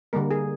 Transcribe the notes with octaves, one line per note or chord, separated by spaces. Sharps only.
D3 G3 A#3 A#4
G#4